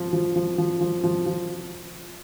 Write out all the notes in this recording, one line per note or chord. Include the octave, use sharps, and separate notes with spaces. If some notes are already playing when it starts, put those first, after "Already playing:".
Already playing: F3
F3
F3
F3
F3
F3
F3